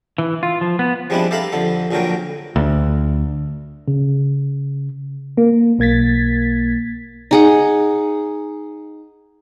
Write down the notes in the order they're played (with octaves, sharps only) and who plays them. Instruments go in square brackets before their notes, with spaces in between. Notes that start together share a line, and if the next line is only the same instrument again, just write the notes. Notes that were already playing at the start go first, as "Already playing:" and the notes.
[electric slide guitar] E3
F4
F3
B3
[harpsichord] F3 G3 G#3 C4 D4 E4
G4 A4 E5 F5 A#5 B5
F2 D3 A4
A#1 A#2 D3 F#3 A#4 G5
[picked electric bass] D2
[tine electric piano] C#3
[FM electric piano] A#3
B1 A#3 G#6 A6 B6
[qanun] D#4 G#4 F#5